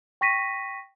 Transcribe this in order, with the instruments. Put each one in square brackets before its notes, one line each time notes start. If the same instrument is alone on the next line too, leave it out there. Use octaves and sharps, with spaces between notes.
[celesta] G5 C#6 A#6 B6 D#7